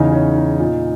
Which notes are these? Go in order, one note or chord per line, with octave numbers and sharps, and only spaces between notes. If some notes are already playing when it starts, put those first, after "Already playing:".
Already playing: E2 C#3 E3 D#4
C#4
D#4
A#2 D#4